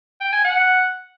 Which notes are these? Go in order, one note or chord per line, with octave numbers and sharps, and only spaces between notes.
G5
G#5
F#5